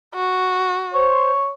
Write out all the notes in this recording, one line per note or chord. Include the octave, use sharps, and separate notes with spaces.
F#4
C5 C#5